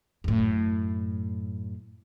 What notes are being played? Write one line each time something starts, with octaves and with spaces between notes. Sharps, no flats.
F#2 A2